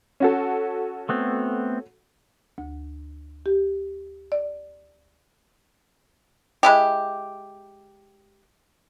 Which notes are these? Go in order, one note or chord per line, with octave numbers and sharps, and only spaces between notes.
C#4 F#4 A4
A3 B3 C4
D2
G4
D5
G#3 E4 G4